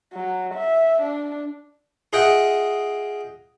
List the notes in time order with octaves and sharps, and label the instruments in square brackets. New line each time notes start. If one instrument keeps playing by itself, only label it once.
[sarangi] F#3
E5
D4
[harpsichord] F4 G#4 D#5 E5 F#5 G5